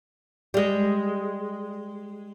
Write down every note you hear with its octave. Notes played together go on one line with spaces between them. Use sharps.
G3 G#3